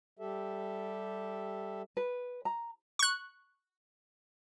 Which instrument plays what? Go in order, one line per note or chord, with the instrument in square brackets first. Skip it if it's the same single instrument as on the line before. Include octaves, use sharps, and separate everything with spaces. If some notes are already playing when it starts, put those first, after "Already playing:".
[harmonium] G3 G4 A4 E5
[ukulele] B4
A#5
[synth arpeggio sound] C#6 F#6